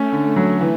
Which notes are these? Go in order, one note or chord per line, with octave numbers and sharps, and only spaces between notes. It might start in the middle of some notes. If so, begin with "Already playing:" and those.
Already playing: A3 C#4
D3
F#3
E3